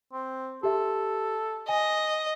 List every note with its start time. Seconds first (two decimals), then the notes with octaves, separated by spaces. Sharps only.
0.13 C4
0.63 G4 A4 E5
1.68 D#5 G#5